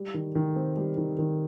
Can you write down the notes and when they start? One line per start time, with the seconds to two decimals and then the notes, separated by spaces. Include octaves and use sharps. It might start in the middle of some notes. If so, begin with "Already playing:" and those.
Already playing: G3
0.14 D#3
0.35 D#3
0.56 C4
0.77 G3
0.97 D#3
1.18 D#3